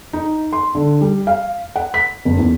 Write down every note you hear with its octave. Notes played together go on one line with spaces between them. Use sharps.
D#4
C6
D3
G3
F5
F#5
B6
F#1
E2